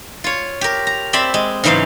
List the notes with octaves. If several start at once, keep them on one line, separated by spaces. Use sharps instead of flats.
F4 C#5
G4 A#4
A#5
C4 D5 E5 B5 C6
G#3
G#2 C#3 E3 F#3 C5 F5